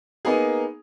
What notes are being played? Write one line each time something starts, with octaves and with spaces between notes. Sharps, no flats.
A#3 B3 D#4 G#4